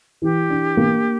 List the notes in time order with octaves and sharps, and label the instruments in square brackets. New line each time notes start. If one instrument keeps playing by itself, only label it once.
[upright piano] E3 [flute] G4
[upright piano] D4
A#3